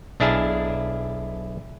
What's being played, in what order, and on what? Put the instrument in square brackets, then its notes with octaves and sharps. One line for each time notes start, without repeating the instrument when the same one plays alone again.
[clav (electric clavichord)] B1 D4 E4 G#4 F5 A5